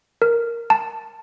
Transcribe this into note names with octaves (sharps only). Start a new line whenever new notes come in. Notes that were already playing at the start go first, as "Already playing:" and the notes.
A#4
A5